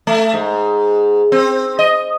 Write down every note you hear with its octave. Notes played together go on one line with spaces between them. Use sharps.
A3
G#2
C4
D#5